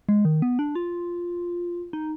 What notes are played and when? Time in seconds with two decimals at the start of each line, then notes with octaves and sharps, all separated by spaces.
0.09 G#3
0.25 D#3
0.42 B3
0.59 D4
0.75 F4
1.93 D#4